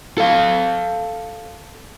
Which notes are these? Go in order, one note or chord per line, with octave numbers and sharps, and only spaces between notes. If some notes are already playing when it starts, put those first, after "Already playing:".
A4 F5